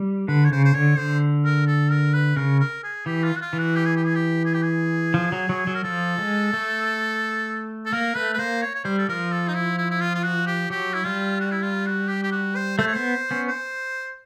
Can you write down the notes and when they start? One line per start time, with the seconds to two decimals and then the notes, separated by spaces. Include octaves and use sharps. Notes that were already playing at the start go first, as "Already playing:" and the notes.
Already playing: G3
0.28 D3 B4
0.45 C#5
0.52 C#3 C5
0.65 C5
0.74 D3 C#5
0.98 D3 C5
1.45 A#4
1.67 A4
1.91 A#4
2.14 B4
2.36 C#3 A#4
2.60 A#4
2.83 G#4
3.06 E3 G4
3.24 F4
3.36 F#4
3.41 F4
3.53 E3
3.58 F#4
3.76 G4
3.85 G#4
3.96 G4
4.06 G#4
4.15 G4
4.45 G#4
4.54 G4
4.62 G#4
5.14 F3
5.32 F#3
5.49 F#3
5.67 F#3
5.75 A#4
5.84 F3 A4
6.18 G#3
6.53 A3
7.86 A4
7.93 A#3 A#4
8.15 A3 B4
8.34 B4
8.39 A#3 C5
8.62 C#5
8.75 C#5
8.84 G3 C5
8.98 A4
9.09 F3 A#4
9.32 A4
9.48 D#4
9.54 E4
9.78 E4
9.91 E4
10.01 F4
10.15 F4
10.23 F#4
10.47 G4
10.70 F#3 G4
10.94 E4
11.05 G3 F4
11.40 F#4
11.52 E4
11.62 F4
11.86 F#4
12.08 G4
12.23 G4
12.32 F#4
12.56 C5
12.78 A3 C5
12.87 C#5
12.95 B3 C5
13.31 B3 C#4
13.48 C5